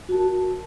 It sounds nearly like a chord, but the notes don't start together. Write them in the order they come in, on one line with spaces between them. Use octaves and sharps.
F#4 A5 A#4